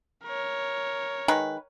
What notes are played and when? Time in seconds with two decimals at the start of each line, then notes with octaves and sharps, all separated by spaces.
0.24 A#4 C#5
1.28 D#3 G#3 B4